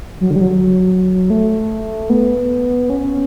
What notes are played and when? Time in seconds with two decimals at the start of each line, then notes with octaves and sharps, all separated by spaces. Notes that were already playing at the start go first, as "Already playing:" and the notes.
0.21 F#3
0.31 D3
0.36 G3
0.41 F#3
1.30 A3
2.10 B3
2.90 C#4